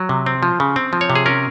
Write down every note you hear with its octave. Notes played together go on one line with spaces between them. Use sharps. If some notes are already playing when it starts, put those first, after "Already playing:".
Already playing: F#3
C3
C4
F3
C#3
C4
F3
C#5
C3
G#4
C#4 A#4